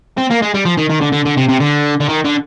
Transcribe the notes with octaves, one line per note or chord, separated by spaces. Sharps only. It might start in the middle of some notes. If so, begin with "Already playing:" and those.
C4
A#3
G#3
G3
F3
D#3
D#3
D3
D3
D3
C3
C3
D3
D3
D#3
D3